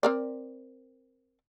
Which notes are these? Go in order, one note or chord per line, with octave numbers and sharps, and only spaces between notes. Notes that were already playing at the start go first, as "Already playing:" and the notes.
C4 A#4 D5